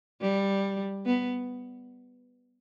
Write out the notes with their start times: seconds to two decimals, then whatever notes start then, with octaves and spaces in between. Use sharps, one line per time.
0.21 G3
1.06 B3